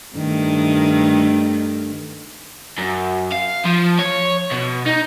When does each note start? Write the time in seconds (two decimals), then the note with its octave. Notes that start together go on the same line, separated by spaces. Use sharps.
0.16 G2 D#3 A3
2.78 F#2
3.32 F5
3.65 F3
3.99 C#5
4.51 B2
4.86 D#4